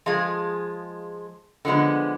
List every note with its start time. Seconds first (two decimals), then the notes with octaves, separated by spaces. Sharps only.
0.06 F3 G#3 F4 G#4
1.65 D3 F3 G#3 B3